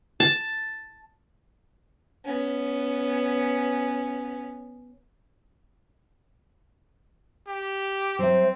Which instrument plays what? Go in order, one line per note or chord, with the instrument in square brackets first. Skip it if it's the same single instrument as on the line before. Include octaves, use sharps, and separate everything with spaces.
[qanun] A5
[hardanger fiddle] B3 C#4
[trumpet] G4
[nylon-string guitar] F#3 E5 [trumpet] C4 [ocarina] C5